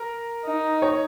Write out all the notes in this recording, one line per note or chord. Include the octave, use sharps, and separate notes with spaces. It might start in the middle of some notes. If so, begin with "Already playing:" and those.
Already playing: A#4
D#4
C#5